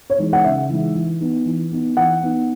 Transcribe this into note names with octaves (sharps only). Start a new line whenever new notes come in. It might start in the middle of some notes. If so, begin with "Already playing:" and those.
C#5
E3 G#3 D#4
F#5
C#3 E5
E3 G#3 D#4
E3
B3 D#4
E3
B3 D#4
E3 F#5
B3 D#4